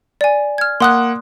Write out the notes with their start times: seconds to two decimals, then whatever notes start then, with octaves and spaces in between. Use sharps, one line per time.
0.21 D5 G#5
0.58 F6 G#6
0.80 A#3 F#5 C6 D#6 F#6